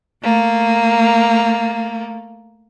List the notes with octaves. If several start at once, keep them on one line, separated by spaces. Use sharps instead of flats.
A3 A#3